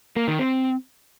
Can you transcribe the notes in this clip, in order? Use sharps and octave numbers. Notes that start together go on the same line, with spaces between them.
A#3
D#3
C4